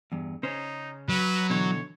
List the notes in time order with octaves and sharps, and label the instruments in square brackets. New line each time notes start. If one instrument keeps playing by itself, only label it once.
[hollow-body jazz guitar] E2 G2
[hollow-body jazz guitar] C#3 C#4 C5 [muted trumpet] D#4
[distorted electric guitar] F#3 [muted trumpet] B4
[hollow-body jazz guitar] B2 D3 E3 [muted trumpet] C#5